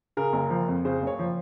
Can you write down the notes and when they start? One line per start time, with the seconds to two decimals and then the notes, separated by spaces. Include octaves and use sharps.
0.17 C#3 A#4
0.33 F#1
0.50 F3
0.68 F2
0.85 C#3 C5
1.02 F#1 C#5
1.19 F3